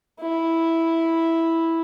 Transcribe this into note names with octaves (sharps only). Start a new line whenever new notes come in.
E4